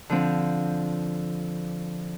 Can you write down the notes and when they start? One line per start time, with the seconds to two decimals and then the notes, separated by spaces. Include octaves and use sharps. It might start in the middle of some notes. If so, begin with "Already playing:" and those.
0.10 D3 F3 C4